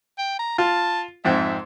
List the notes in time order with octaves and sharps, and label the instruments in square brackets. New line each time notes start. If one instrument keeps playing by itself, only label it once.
[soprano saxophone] G5
A#5
[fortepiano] F4 [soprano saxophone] A5
[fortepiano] F2 G#2 C4 [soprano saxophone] E5